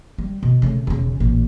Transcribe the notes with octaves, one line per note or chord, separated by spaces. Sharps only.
G3
B2
C#3 A3
E1 C#3
A1 A#2